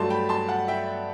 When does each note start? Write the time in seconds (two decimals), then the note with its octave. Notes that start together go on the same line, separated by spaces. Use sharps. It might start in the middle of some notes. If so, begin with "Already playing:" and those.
Already playing: G2 F#3 A3 A5 C6
0.10 G5 B5
0.29 A5 C6
0.49 F#5 A5
0.68 E5 G5